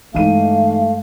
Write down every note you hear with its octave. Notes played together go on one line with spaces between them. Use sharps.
G2 E3 G#3 A3 D#4 F5 D#7